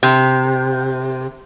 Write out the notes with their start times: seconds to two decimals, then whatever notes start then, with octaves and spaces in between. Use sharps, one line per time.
0.03 C3